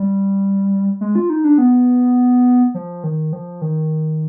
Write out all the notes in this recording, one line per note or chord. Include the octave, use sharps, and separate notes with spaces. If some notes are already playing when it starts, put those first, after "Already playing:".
Already playing: G3
G#3
F4
D#4
D4
B3
F3
D#3
F3
D#3